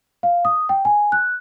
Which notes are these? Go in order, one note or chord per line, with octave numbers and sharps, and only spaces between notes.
F5
D#6
G5
G#5
F#6